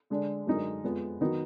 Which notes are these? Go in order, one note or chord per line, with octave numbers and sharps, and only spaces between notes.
D3 G#3 D4
F#2 D3 G#3 D#4 A#4
F2 F3 G#3 B3
D#3 F#3 B3 D#4